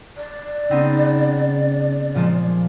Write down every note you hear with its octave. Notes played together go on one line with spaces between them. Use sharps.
D5
C#3 B3 C4 D#4
A#2 F3 G#3